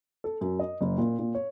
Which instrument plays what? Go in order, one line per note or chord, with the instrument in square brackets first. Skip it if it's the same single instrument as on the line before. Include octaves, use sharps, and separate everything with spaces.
[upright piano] A4
F#2
D#5
F#1
A#2
A#2
C#5